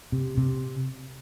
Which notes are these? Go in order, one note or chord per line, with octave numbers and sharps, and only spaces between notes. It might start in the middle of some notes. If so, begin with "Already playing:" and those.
C3
C3